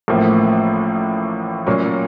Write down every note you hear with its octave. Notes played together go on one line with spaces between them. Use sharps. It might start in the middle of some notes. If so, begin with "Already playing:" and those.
A1 A2 F3 A#3
A#2 F#3 A#3 C#4